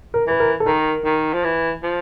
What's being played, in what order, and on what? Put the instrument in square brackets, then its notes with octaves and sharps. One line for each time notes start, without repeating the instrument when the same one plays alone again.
[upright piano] A#4
[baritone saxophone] E3 [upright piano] B4
[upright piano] A#4
A4
[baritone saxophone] D#3 [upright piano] A#4
[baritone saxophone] D#3
F3
E3
F3